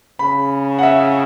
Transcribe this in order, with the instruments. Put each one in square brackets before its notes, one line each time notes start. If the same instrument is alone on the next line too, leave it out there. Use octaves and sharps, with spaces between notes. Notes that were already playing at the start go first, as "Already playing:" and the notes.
[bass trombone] C#3 [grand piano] B5
[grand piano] F#5
E5